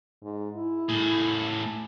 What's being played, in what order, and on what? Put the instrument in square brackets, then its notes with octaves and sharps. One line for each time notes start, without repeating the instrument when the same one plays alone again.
[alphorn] G#2
E4
[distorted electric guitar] A2 G#4